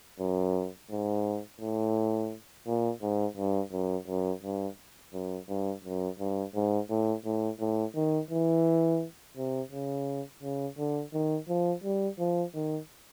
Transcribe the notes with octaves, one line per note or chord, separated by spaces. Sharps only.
F#2
G#2
A2
A#2
G#2
G2
F#2
F#2
G2
F#2
G2
F#2
G2
G#2
A2
A2
A2
D#3
E3
C3
C#3
C#3
D3
D#3
F3
G3
F3
D#3